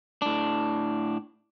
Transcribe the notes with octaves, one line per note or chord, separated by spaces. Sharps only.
A2 D4